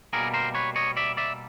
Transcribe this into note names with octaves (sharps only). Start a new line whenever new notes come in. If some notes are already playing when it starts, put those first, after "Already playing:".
B2 G3 A#3 G#4 A#4
A#4 C5
B4 C#5
C#5 D#5
D5 E5
D5 E5